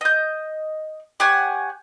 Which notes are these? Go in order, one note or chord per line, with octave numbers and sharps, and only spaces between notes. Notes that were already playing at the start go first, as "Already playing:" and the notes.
D#5 G6
G4 C#5 F#5 G#5